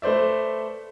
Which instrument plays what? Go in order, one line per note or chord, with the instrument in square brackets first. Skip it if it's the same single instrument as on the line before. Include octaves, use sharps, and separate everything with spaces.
[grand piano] A3 B4 C5 D5 E5